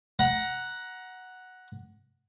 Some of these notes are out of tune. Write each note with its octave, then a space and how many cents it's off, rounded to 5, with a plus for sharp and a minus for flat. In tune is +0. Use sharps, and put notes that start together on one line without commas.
F#5 +0 A#5 +25